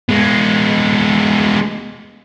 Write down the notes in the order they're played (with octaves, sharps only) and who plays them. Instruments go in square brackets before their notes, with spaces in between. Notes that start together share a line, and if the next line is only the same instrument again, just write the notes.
[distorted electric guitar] G#3 B3